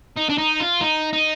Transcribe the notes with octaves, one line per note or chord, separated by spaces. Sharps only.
D#4
D4
D#4
F4
D#4
D#4